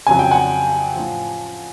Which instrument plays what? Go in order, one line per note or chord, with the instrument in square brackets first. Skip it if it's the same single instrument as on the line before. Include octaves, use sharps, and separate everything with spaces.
[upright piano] F2 C#3 F#3 G#5
G5
F#5 G#5
A2 F3